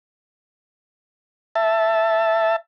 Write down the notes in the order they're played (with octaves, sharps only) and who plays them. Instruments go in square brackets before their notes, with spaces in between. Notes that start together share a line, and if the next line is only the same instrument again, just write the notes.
[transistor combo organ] E5 A5